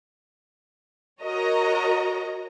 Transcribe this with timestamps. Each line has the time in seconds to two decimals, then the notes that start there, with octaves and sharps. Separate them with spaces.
1.23 F#4 A#4 C#5 D#5 A#5